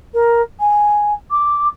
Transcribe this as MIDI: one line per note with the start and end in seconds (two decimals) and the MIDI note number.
0.14 0.42 70
0.60 1.13 80
1.31 1.68 86